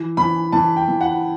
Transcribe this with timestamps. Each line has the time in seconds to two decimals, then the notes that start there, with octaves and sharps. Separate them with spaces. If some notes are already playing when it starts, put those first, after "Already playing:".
Already playing: E3
0.17 E3 B5
0.52 E3 A5
0.76 G5
0.88 E3
1.01 F#5